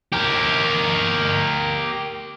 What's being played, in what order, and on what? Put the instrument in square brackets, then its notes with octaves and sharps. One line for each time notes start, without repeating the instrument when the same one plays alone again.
[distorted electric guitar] G4 A#4